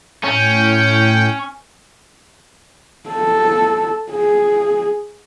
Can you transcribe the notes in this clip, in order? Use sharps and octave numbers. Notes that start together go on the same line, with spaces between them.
A2 C#4 G5
A4
G#4